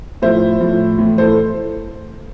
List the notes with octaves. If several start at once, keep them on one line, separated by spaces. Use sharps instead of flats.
A2 F3 C5 E5
A2 F3
A2 E3
A4 C5